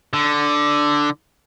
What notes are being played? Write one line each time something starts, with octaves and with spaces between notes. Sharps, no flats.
D3